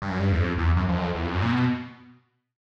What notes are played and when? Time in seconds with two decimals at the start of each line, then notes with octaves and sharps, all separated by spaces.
0.02 G2
0.10 F#2
0.20 G2
0.32 E2
0.39 F2
0.58 E2
0.76 F#2
0.89 F2
0.97 F#2
1.02 F2
1.15 E2
1.24 F2
1.34 F#2
1.42 A#2
1.52 B2